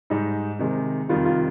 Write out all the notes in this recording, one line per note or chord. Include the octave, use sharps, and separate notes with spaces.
G#2 G3 D#4
C3 D#3 G#3
F2 C3 D#3 G3 F4
F4